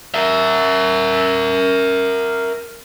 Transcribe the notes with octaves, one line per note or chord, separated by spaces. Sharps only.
A#4 E5